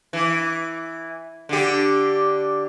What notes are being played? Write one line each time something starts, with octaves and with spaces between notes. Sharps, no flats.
E3
D3 G4